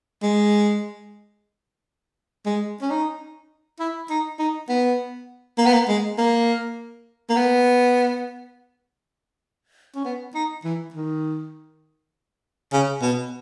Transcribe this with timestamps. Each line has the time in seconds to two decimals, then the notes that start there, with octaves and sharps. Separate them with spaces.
0.23 G#3
2.46 G#3
2.81 C#4
2.90 D#4
3.80 E4
4.10 D#4
4.39 D#4
4.69 B3
5.58 A#3
5.66 B3
5.73 A#3
5.88 G#3
6.18 A#3
7.30 A#3
7.37 B3
9.95 C#4
10.05 B3
10.34 D#4
10.64 E3
10.94 D#3
12.73 C#3
13.02 B2